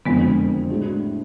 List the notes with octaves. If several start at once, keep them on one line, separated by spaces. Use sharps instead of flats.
F#1 F2 D3 G#3 B3
A2 G#3 D4 F#4